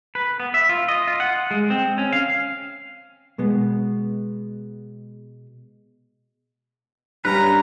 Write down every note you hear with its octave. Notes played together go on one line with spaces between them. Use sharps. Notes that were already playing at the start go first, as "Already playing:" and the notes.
B4
B3
E5
F4
D#5
F4
F#5
G#3
C4
C#4
F5
B2 G#3 B3
G2 C#4 A#4 B4 A#5